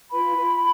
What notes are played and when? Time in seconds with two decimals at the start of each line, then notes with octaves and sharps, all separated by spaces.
0.11 F4 B4 B5
0.36 F4